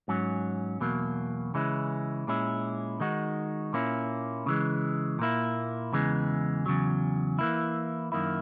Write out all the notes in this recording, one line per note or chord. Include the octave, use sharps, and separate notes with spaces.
G#2 F#3 C#4
E2 B2 F#3 A#3
C#3 E3 G#3 C#4 E4
A#2 G#3 C#4 E4
D#3 G#3 D#4 F#4
A#2 A#3 C#4 E4
C#3 E3 G#3
A#2 A#3 E4
E2 C#3 E3 G#3
E2 C#3 F#3
E3 A#3 E4
F#2 D#3 A#3 E4